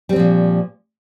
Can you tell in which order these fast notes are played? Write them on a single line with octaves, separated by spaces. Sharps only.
G3 C4 F3 A#2